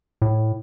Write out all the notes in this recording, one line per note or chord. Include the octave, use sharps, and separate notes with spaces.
A2